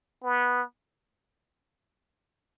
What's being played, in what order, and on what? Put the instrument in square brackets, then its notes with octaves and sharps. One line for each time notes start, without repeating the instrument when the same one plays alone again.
[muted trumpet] B3